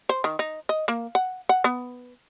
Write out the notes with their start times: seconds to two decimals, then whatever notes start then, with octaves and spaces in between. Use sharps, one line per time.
0.09 C5
0.24 D#3
0.39 D#4
0.69 D#5
0.88 A#3
1.15 F#5
1.49 F#5
1.64 B3